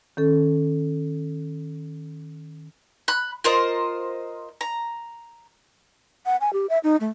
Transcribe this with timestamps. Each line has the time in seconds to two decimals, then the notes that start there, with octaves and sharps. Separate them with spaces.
0.17 D#3 C#4 A4
3.08 B5 F#6
3.44 F4 A#4 C5 D#5
4.61 A#5
6.25 F#5
6.41 G#5
6.53 G4
6.70 E5
6.84 D#4
7.01 A3